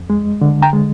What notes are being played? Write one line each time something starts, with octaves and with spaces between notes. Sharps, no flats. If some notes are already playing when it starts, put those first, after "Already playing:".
Already playing: F2
G#3
D3
G5 A#5
G#3